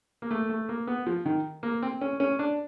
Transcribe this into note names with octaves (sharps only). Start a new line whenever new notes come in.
A#3
A3
A3
A#3
B3
F3
D#3
A#3
C4
C#4
C#4
D4